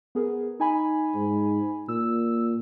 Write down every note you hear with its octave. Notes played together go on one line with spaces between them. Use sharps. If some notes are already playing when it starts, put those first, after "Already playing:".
B3 G#4 A#4
D#4 G#5 B5
G#2
A#2 E6